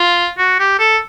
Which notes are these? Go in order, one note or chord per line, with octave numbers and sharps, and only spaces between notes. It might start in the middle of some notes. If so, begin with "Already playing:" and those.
Already playing: F4
F#4
G4
A4